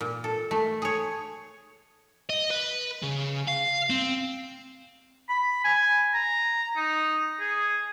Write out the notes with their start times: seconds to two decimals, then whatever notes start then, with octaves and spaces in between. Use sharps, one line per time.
0.01 A#2
0.24 A4
0.51 A3
0.82 G#4 C#5
2.29 D#5
2.50 B4
3.03 C#3
3.48 F5
3.90 C4
5.29 B5
5.64 G#5
6.14 A#5
6.77 D#4
7.40 G#4